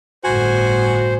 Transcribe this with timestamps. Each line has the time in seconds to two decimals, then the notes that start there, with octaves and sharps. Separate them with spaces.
0.24 G1 A2 F#4 C5 G#5